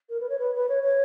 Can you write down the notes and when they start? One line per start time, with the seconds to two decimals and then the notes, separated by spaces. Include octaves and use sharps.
0.09 A#4
0.20 B4
0.29 C#5
0.39 B4
0.54 B4
0.69 C#5
0.83 C#5